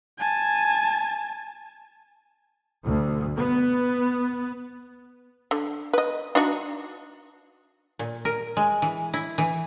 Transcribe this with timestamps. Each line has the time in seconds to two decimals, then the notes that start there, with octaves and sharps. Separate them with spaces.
0.19 G#5 A5
2.86 D2
3.38 B3
5.51 D3
5.93 B4 D#5
6.35 D4 D#4 F#4
7.99 A#2
8.25 A#4
8.57 G#3
8.82 E3
9.14 E4
9.38 E3